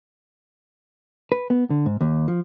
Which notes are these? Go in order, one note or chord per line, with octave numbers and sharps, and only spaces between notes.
B4
B3
D3
G#2
D#2
F3